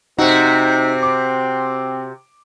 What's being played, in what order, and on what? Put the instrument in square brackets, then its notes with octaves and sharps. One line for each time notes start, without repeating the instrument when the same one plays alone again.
[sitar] C3 F#4 [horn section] C4 [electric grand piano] D#4
[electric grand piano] D6